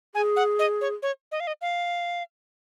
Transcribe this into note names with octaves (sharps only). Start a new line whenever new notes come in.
G#4 G#5
F#5
D#5
C#5
C#5
D#5
F5
D#5
F5